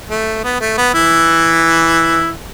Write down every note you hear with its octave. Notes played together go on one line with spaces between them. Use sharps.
A3
B3
A3
B3
E3 E4